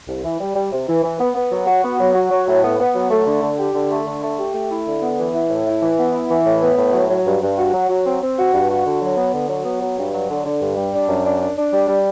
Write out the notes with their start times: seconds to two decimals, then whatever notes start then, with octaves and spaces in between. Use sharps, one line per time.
0.08 C2
0.24 E3
0.40 G3
0.56 G3
0.73 C3
0.88 E3
1.04 E3
1.20 B3
1.35 B3
1.52 F#3
1.67 F#4
1.83 B3
2.00 F#3
2.15 F#4
2.31 F#3
2.48 A2
2.64 B3
2.79 B3
2.95 F#3
3.11 A3
3.27 D3
3.43 D3
3.59 G4
3.75 D3
3.91 A3
4.07 D3
4.23 A3
4.39 G4
4.55 A3
4.71 E4
4.87 D3
5.03 B3
5.19 E3
5.34 E4
5.50 A2
5.67 E4
5.82 E3
5.99 B3
6.14 E4
6.31 E3
6.46 A2
6.62 B3
6.78 A2
6.94 F#3
7.10 F#3
7.27 G2
7.43 G2
7.59 F#4
7.74 F#3
7.89 F#3
8.05 C4
8.22 C4
8.38 F#4
8.54 G2
8.69 F#4
8.86 D3
9.02 F#3
9.17 B3
9.33 D3
9.49 F#3
9.65 B3
9.82 F#3
9.97 G2
10.14 F#3
10.30 D3
10.45 D3
10.61 G2
10.77 G3
10.93 D4
11.09 F#2
11.26 D4
11.41 D4
11.57 D4
11.73 G3
11.88 G3